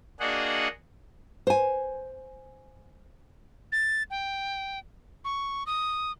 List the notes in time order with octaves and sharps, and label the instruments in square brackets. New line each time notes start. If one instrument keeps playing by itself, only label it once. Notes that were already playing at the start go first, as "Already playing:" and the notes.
[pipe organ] A#3 D4 F#4 G#4 D#5 F#5
[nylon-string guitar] C5 G#5
[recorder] A6
G5
C#6
D#6